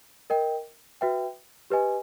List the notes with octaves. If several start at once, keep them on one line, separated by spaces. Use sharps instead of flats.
A#4 D#5 G5
F#4 B4 E5 G5
G4 B4 D#5 G#5